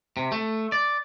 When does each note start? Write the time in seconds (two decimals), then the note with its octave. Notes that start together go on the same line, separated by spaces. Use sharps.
0.17 C3
0.32 A3
0.72 D5